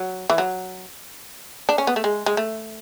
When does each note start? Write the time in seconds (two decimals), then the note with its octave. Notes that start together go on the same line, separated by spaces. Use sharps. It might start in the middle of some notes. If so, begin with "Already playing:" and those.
Already playing: F#3
0.30 E3
0.38 F#3
1.69 D4
1.78 C#4
1.87 B3
1.96 A3
2.04 G#3
2.26 G#3
2.37 A3